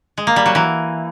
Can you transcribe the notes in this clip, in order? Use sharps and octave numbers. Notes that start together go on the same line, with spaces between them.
G#3
A#3
G3
F#3
E3